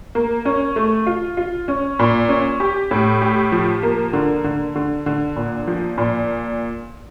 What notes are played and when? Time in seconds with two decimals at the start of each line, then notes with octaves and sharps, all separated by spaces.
0.15 A#3
0.45 C#4
0.76 A3
1.06 F4
1.37 F4
1.68 C#4
1.99 A#2
2.29 C#4
2.60 G4
2.91 A2
3.22 G4
3.52 F3
3.83 A#3
4.13 D3
4.44 D3
4.76 D3
5.06 D3
5.36 A#2
5.67 F3
5.98 A#2